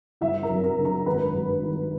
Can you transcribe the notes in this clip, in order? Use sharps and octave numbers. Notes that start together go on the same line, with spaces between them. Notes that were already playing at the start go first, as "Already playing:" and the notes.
G1 E4 E5
A#4 A#5
F#2
A#4 A#5
D3
A#4 A#5
G#1 B4 B5
G2
D#3